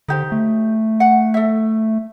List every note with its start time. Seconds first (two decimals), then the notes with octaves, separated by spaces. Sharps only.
0.08 D3 D#4 G4 C5
0.32 A3
1.00 F#5
1.34 A4 E5